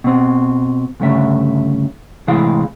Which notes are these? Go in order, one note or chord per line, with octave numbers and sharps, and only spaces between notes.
B2 C4
D2 G2 C#3 A3 E5
A2 C3 E3 G#3 G#4 F5